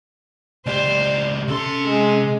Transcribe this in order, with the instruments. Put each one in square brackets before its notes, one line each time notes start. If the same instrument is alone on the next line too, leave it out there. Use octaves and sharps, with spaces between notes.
[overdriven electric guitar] C#2 G4 [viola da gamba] C5 [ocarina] D5
[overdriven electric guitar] C3 C6 [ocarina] C#4 [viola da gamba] A4
[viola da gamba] G#3